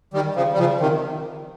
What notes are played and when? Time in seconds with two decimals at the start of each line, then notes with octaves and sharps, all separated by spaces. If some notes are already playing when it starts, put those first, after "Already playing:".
0.14 D#3 G3
0.35 C#3 F3
0.53 G3
0.58 C#3 F3
0.81 C3 D#3